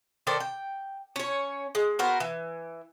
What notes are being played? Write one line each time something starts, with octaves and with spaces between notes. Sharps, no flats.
D#3 A4 C5 D5
G5
C#4 C#5
G#3
B3 F#4 A#4 C5
E3